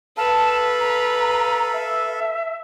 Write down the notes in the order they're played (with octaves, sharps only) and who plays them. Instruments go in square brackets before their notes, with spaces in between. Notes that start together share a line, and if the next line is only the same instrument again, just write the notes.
[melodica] A4 F5 [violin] B4 [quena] A5
[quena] A#5
E5